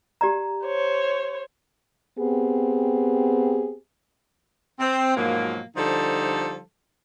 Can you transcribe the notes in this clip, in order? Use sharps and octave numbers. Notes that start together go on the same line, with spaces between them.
G4 D5 A#5
C5 C#5
B3 C4 G4 G#4
C4
G#2 B2 F3 F#3 A#3
D3 F3 G3 D#4 A4 C5